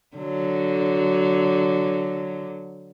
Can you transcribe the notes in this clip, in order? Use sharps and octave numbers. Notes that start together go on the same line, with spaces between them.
D3 F#3